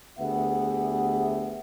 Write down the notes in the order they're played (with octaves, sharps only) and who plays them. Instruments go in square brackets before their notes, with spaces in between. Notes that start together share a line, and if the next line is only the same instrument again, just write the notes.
[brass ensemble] D2 B3 G4 G#4 E5 F#5